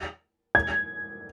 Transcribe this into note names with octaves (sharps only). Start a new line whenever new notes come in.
G#6